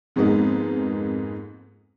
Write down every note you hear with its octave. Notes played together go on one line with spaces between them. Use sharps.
F2 G#2 G#3 A#3 B3 D#4